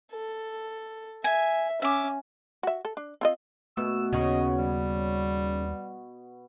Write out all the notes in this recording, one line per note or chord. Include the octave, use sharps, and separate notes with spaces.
A4
E5 G#5
C#4 E5 D6
F#4 E5
A4
D4
C4 F4 D#5
B2 A3 E6
D#2 C#3 C#4 D#4 F#4 D#5 C#6
G3